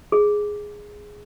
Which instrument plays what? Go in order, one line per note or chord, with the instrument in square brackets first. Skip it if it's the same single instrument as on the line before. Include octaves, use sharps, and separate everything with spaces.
[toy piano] G#4